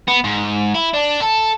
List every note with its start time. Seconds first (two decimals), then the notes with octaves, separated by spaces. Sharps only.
0.08 B3
0.24 G#2
0.75 E4
0.93 D4
1.20 A4